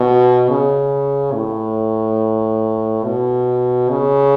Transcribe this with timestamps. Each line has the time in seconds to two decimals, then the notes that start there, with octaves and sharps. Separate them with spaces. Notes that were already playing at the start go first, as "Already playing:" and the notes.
Already playing: B2
0.49 C#3
1.33 A2
3.04 B2
3.90 C#3